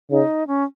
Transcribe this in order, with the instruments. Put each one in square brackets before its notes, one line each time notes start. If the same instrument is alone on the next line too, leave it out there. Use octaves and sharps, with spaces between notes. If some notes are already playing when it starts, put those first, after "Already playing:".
[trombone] C#3 [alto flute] D#4
[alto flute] C#4